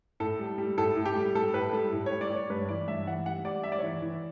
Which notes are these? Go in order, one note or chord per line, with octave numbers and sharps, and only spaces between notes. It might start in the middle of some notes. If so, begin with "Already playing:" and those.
A2 A4
G3
G3
A2 A4
A2
G4
G3
G3 A4
A2 B4
G3 A4
A2
G3 C#5
D5
G3 C#5
G2 B4
E3 D5
G2 E5
E3 F#5
G3 F#5
G3 D5
G3 E5
D5
C#5
E3 D5
E3